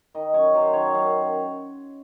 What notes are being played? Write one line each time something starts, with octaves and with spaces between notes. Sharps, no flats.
D#3 D#5
F#2 C#5
F#3 C5
D#3 C#5
F#2 F5